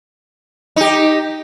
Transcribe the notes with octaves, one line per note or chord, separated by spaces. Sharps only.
D#4 G4